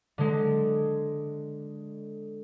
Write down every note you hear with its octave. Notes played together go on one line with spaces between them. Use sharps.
D3 G#3